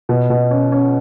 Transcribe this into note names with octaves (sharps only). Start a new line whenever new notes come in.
B2
B2
C#4
C#4